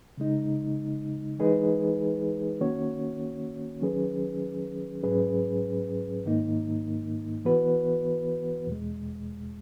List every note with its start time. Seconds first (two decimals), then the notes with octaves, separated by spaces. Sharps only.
0.18 C#3 G#3 D#4
1.39 E3 G#3 D#4 G#4 B4
2.61 D#3 A#3 C#4 F#4 C#5
3.81 D#3 F#3 C#4 G#4 B4
5.03 G#2 F#3 C#4 G#4 B4
6.25 G#2 D#3 A#3 D#4
7.45 E3 B3 F#4 B4
8.67 E2 B2 G#3